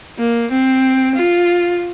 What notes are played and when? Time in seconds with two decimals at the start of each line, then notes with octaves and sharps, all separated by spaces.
0.19 A#3
0.51 C4
1.15 F4